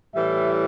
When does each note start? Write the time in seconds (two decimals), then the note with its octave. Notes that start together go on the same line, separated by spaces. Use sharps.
0.15 A2 E3 G3 E5